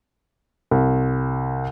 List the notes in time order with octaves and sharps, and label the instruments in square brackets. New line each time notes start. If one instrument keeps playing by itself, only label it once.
[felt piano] C2